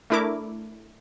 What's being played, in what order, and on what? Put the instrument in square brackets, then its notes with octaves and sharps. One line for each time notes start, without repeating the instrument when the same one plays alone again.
[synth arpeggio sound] A3 D4 E4 A#4 D6